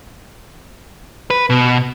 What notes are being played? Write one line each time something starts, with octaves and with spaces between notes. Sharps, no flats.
B4
B2